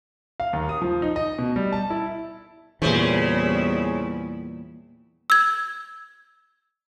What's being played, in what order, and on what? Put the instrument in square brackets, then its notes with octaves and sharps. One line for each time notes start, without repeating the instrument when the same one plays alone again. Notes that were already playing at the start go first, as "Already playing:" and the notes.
[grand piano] F5
D#2
D#6
F3
D#4
D#5
B2
G3
A5
E4
[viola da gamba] E2 G3 E4 [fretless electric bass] A#2 E3 [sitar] C#3 C5
[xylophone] E6 G#6